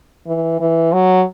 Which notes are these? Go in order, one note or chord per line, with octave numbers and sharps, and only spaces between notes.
E3
E3
F#3